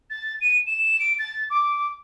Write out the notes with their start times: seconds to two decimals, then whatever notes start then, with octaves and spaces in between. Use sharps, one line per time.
0.10 A6
0.41 D#7
0.66 E7
1.00 D7
1.19 A6
1.50 D6